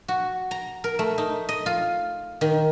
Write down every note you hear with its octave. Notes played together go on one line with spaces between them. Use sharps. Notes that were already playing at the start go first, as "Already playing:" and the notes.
F#4
A#5
A#4
A3
D#4
D#5
F4
D#3